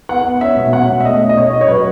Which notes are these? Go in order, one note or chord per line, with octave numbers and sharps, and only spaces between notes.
B3 F#5
B3
C#4 E5
B2
B2 F#5
B2
E5
A3 D#5
C#4
D#5
C#4 C#5
C#4 D#5
C#5
F#3 B4